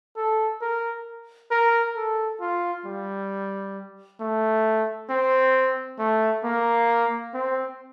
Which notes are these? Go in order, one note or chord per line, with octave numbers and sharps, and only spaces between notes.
A4
A#4
A#4
A4
F4
G3
A3
C4
A3
A#3
C4